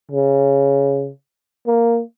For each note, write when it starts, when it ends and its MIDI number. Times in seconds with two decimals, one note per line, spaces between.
0.11 1.11 49
1.67 2.02 58